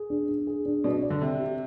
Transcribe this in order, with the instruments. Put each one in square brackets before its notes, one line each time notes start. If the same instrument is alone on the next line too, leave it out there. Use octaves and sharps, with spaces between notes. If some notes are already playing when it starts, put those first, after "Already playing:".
Already playing: [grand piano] G#4
D4
D4
G#4
D4
[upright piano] B2 [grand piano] D5
[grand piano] D5
[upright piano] D3
[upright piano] C3 [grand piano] C4
[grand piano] G4